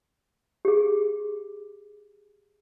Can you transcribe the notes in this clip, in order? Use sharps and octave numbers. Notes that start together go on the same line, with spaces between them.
G4 G#4